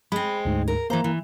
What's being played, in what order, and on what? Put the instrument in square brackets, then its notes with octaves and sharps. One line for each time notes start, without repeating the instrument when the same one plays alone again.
[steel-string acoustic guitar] G#3 C4 [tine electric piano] B5
[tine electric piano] D2 G#2
[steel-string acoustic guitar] A#4
[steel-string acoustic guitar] E3 C5 [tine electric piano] A#3 A#5
[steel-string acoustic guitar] E3